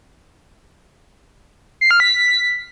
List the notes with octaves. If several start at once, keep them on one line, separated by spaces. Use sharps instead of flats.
C7
F6
B6